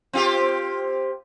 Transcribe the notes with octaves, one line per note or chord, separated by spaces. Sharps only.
C4 F4 G4